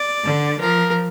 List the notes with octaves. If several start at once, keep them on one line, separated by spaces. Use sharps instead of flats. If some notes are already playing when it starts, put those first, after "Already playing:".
Already playing: D5
D3
F3 A#4